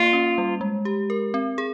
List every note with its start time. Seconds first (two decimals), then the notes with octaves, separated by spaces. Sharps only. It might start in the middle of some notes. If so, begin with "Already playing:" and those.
Already playing: A#3 F4
0.13 C#4
0.38 G3
0.61 G#3
0.85 G4
1.10 A#4
1.34 C4
1.58 G#4